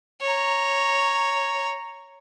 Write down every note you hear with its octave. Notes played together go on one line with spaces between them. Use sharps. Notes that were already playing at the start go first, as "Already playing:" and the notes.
C#5 A#5